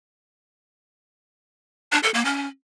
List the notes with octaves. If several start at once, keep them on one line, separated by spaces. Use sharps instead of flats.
D4
A4
A#3
C#4